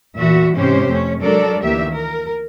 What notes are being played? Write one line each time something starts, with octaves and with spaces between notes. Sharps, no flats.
E2 A#2 E3 F#4 E5
G#2 C3 E3 C#4 G4 C5
F2 A3 C#4
F#3 G#3 D4 A4 A#4 D5
D2 D#3 E3 A#3 G4 E5
A#4